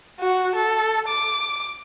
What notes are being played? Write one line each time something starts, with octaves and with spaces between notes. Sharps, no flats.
F#4
A4
D6